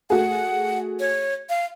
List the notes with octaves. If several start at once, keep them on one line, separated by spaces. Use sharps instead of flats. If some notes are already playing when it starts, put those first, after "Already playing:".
A3 F#4 G#4 F#5
C#5
F5